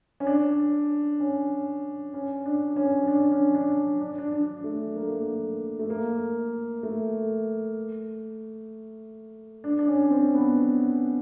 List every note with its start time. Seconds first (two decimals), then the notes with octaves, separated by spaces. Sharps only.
0.20 C#4
0.27 D4
1.20 C#4
2.14 C#4
2.46 D4
2.76 C#4
3.08 D4
3.20 D4
3.31 C#4
3.55 D4
4.01 D4
4.18 D4
4.32 D4
4.64 A3
4.96 A#3
5.02 A3
5.09 A#3
5.79 A3
5.90 A#3
6.83 A3
9.64 D4
9.79 D4
9.88 C#4
10.10 C4
10.35 B3